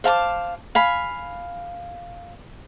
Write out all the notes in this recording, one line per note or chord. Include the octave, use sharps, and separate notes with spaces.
C5 F5 A5 D6
F5 G#5 B5